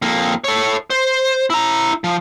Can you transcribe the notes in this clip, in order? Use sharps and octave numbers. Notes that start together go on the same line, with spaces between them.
F2 A#3
A4 C#5
C5
E4 A#5
F3